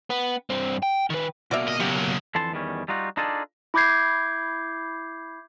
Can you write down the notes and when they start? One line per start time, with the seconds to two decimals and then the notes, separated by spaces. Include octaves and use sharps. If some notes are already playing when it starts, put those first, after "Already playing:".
0.10 B3
0.50 G2 C4
0.83 G5
1.10 D#3 B4
1.51 B2 A#3 F#4 D5 E5
1.68 D#5
1.80 C#3 F#3 G4
2.35 F2 D3 E3 A4 A5 C6
2.52 E2 D#3 G3 C#4
2.88 G3 D#4 F4 F#4
3.17 D4 D#4 F4 G#4 A4 D5
3.74 E4 B5 D6 G6 G#6 C7